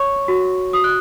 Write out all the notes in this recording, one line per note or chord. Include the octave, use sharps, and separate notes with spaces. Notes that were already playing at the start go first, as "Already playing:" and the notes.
Already playing: C#5 C#6
F#4
F#4 D#6
F#6